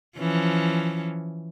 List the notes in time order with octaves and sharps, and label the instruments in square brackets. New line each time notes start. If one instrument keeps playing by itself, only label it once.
[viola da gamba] E3 F3 C#4